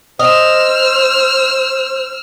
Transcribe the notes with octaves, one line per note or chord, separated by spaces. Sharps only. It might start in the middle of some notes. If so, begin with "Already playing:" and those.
C5 D#5 E6 F6